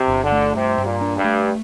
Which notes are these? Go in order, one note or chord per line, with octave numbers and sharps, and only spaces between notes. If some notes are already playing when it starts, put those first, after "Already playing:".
Already playing: C3
G1
D3
A3
G2 C3
G2
A#2
D4
G2
A3